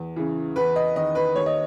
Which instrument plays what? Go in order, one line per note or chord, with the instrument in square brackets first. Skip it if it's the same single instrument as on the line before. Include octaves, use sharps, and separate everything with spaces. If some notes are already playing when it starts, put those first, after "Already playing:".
Already playing: [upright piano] E2
C#3 E3
E2 B4
D#5
D#3 D#5
B4
D#2 C#5
D#5